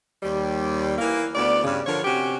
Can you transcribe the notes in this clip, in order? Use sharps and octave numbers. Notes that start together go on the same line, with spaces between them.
D#2 G3
E3 A#3
D2 B3 D5
G2 C#3
D3 F3 A#4 C#5
C3 C#4 F#4 G4